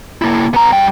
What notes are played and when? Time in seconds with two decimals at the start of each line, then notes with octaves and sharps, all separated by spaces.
0.22 A#3 E4
0.54 B3 A#5
0.72 G2 G5